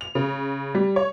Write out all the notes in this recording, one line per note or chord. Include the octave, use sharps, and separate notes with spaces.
F7
C#3
G3
C#5